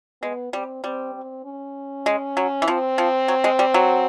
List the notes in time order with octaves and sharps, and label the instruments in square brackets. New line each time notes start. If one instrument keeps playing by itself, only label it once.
[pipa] G#3 [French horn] B3
[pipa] G3 [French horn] C4
[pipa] G3 [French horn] C4
[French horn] C4
C#4
[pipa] G#3
F#3
E3
[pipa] F3 [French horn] C4
[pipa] F3
F#3
G#3
G3
F#3